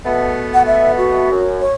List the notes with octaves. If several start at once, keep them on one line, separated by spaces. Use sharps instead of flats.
B2 A3 B3
F#5
E5
F#4
F#2
C#5